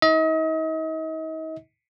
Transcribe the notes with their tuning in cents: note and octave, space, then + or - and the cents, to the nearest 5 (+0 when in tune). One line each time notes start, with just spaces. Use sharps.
D#4 +40 D#5 +40